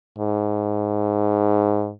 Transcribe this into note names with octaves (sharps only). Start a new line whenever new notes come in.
G#2